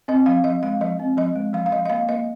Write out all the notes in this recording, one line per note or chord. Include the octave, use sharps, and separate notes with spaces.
C4 D#5
F3 F5
F3 D#5
G#3 F5
F3 D#5
C4
F3 D#5
G#3
F3 F5
F5
F3 D#5
D#5
A#3 F5
A#3 D#5